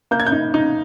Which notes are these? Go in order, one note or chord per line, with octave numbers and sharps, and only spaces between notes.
A#3 G6
G#6
G6
D#4
D#4